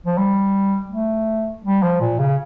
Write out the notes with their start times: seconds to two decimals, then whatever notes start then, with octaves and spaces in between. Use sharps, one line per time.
0.06 F3
0.18 G3
0.91 A3
1.64 G3
1.83 F3
2.01 A#2
2.19 C#3